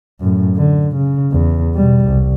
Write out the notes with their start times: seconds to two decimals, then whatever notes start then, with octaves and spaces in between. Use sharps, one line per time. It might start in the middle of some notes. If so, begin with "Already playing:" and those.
0.20 F#2 A2
0.56 D3
0.96 C#3
1.32 E2
1.75 B2 G3
2.06 C2